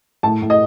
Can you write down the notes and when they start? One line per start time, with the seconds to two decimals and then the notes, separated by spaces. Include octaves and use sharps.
0.23 A2 A5
0.42 A2
0.50 D#5